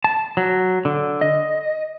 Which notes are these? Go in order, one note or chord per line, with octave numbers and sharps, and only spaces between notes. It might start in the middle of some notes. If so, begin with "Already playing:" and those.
A5
F#3
D3
D#5